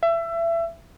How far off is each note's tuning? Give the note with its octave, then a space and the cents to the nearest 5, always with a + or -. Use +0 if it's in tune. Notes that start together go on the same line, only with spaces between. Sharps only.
E5 +25